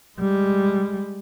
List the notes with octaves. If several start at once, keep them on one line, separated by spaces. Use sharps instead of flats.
G3 G#3